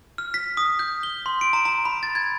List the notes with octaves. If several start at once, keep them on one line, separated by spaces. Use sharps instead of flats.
F6
B6
D#6
G6
G7
C6
D7
A#5
A#5
B5
A6
G#6